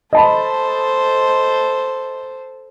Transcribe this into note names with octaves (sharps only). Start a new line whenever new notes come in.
A4 C5 D#5 A5 B5